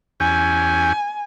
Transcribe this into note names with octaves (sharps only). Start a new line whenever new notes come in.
E2 C#4 G4 G#5